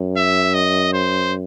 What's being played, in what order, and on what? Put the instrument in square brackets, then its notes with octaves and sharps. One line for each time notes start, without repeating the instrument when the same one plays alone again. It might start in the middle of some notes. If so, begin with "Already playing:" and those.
Already playing: [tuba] F#2
[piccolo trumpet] E5
D#5
C5